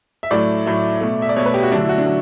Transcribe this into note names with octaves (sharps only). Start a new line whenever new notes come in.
E5
A2 F#3 A3 D5
A2 F#3 A3
B2 A3
E5
D5
B2 A3 C#5
B4
G4
F#4
D3 F#3 A3 D4
E4
F#4
D4
F#3